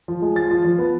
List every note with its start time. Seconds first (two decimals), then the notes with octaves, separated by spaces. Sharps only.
0.08 F3
0.22 G#3
0.36 F3 A6
0.51 F3
0.65 F3
0.78 B3